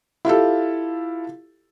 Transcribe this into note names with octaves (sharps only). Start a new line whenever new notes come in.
E4 F4 G4 A4